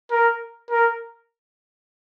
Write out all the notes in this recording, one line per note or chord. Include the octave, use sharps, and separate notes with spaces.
A#4
A#4